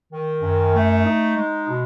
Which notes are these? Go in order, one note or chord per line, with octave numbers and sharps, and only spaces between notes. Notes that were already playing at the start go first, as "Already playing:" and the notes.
D#3
F#2
A3
D#4
G#3
B2